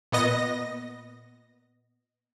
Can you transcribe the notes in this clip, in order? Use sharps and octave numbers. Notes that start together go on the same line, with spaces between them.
A#2 B3 D#5 A#6